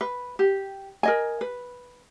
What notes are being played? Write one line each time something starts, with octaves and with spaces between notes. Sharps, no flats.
B4
G4
A#4 D#5 G#5
B4